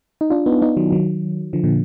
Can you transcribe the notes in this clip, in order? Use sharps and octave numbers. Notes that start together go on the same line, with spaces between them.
D#4
D4 F4
B3 D#4
B3 D#4
D#3 F#3
D#3 F#3
D3 F3
A#2 D3